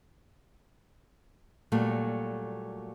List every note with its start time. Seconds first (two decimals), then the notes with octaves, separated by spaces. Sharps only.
1.72 A#2 F#3 G3 A3 A#3